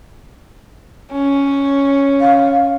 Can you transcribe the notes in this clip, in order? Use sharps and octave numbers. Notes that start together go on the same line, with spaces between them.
C#4
F5